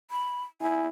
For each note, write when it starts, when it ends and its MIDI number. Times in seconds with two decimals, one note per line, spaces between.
0.11 0.42 83
0.61 0.89 64
0.61 0.83 80